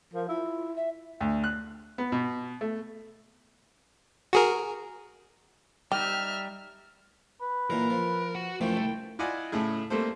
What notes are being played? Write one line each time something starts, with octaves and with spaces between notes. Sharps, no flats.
F3 A#4
E4 F4
E5
D2
F#6
B3
B2
A3
F#4 G#4 A#4
G3 D#4 G4 E5 F6
B4
A#2 E3 F#3 A#4
F3
F#4 F#5
F#2 E3 F3 A3 G5
C2
E4 F4 D5 D#5 F#5 G#5
A2 C#3 A3 E4 G#4
G3 A3 A#3 C4 A4 C5